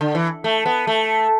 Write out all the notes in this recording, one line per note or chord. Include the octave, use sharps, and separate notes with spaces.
D3
E3
A3
B3
A3